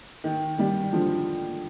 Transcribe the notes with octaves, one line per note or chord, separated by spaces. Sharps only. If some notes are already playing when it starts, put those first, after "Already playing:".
D#3
D#3 G3
D3 F3